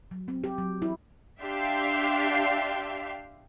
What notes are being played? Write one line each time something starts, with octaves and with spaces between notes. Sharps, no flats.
F#3
C4
G4
F#3
E4
D4 G4 E5 F5 G5 C6